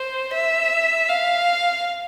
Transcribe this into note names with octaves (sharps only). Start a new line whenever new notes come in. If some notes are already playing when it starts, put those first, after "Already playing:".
Already playing: C5
E5
F5